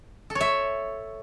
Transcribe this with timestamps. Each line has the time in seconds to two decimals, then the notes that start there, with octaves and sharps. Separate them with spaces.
0.30 A4
0.35 C#5
0.41 E5